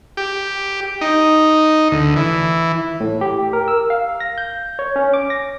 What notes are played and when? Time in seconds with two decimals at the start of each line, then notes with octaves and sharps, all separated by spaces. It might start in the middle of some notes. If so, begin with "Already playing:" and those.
0.17 G4
1.01 D#4
1.92 D2
2.16 E3
3.00 A2
3.21 G4
3.53 A#4
3.68 E6
3.90 F5
4.20 A#6
4.38 G6
4.79 C#5
4.96 C#4
5.14 D6
5.30 A#6